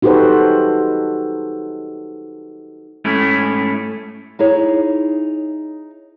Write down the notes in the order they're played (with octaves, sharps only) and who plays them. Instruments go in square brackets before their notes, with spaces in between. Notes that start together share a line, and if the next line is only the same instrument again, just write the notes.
[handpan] D#4 F#4 G4 A4 B4 C5
[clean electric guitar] G#2 A3 C#4 E4
[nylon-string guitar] D#4 E4 G#4 C#5